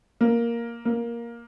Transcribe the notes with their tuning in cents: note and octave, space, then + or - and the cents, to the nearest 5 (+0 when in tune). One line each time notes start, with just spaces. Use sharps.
A#3 +5
A#3 +10